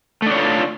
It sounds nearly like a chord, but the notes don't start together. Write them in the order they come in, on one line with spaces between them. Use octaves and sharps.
A3 D4 C#5 F4 A4